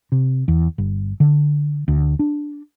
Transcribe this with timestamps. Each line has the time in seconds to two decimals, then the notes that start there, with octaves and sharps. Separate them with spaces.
0.12 C3
0.48 E2
0.78 G1
1.20 D3
1.88 D2
2.19 D4